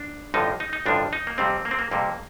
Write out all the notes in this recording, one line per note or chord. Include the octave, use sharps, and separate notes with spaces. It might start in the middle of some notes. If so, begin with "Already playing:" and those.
Already playing: D4
A1 G2 D3 F3 D#4
D#4
D#4
A1 G2 D3 F3 D4
D#4
A#3
F2 C3 G3 C4
A#3
C4
A#3
F2 C3 G3 A#3